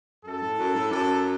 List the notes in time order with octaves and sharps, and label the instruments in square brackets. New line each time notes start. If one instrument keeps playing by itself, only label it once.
[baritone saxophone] F#2 [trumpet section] A4
[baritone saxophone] A2
F#2
A2
[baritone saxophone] F#2 [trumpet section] A4